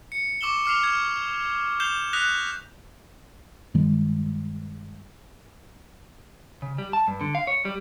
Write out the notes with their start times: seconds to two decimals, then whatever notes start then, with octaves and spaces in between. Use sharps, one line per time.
0.12 C#7
0.41 C#6 D6 E6 E7 G7
0.66 D6 F6 C7 F7
0.83 F6 G#6
1.80 G6 C7 E7 F7 G7
2.13 D#6 F#6 A#6 B6 F7
3.74 G2 D#3 G3 G#3
6.62 C#3
6.78 G3
6.93 A5
7.08 G2
7.21 D3
7.35 F5
7.47 C#5
7.65 G3